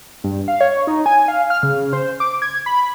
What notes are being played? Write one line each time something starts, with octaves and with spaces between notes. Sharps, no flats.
G2
F5
C#5
D#4
G#5
F5
F6
C#3
C5
D6
G#6
B5